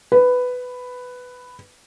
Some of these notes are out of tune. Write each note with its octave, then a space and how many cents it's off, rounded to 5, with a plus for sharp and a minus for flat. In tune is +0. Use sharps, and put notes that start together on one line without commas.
B4 +10